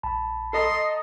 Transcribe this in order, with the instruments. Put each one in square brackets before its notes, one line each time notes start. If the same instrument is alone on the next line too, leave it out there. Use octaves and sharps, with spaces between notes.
[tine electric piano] A#1 A5 B5
[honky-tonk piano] A4 D#5 A#5 [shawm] C6